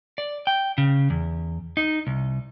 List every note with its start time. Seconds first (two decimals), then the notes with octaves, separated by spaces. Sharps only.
0.18 D5
0.47 G5
0.78 C#3
1.10 E2
1.77 D#4
2.07 C2